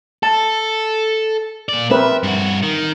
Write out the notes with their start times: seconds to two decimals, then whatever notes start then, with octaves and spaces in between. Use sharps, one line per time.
0.23 A4 A5
1.69 A#2 D5
1.91 C4 A#4 B4 E5
2.23 G2 F#4
2.63 D#3